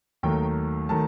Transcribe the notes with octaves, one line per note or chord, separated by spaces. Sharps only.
D#2 D#3 F#3 A3 G5
D#3 F#3 A3 A5